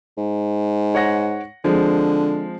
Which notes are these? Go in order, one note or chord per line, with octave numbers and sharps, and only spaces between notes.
G#2
C#5 F#5 A#6
D3 F3 G#3 C4